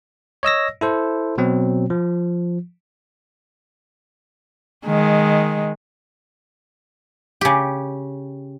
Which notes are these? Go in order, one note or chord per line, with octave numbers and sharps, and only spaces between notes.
C#5 D#5 E6 A#6
E4 A4 C5
B2 F#3 C4
F3
D#3 G#3
C#3 G4